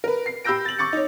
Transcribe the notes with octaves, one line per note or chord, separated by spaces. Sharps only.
A#4 B4
C7
G4 B5 E6 G6 A#6 D7
A6 F#7
C#6 D6 A6 C#7
D#4 C#5